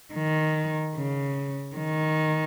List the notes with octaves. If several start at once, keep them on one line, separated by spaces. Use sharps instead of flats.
D#3
C#3
D#3